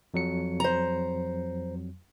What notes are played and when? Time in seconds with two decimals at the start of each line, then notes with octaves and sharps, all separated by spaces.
0.14 F2 F#3 C#7
0.60 C5 A#5